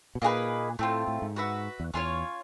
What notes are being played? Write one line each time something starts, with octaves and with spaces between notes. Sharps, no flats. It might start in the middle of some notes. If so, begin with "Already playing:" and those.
B2
A#2 A#3 D#4 G#4 B4
A2 A3 C4 F4
A2
G#2
F#4 B4 E5
E2
E2 C#4 F4 A#4 C#5